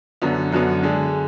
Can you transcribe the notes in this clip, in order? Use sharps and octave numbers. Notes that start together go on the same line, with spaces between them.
F#2 D3 F#3 B3
F#2 D3 F#3 B3
D3 G#3 D4